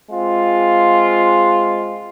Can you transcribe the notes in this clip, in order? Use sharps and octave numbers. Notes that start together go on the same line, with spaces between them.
G#3 C4 F4